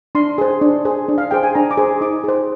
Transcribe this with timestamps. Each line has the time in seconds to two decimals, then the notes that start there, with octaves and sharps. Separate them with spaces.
0.15 D4 C6
0.38 G#4 C5
0.61 D4
0.85 G#4 C5
1.08 D4
1.18 F5
1.31 G#4 C5 G5
1.43 G#5
1.55 D4 A#5
1.71 D6
1.77 G#4 C5
2.01 D#4 D6
2.24 G#4 C5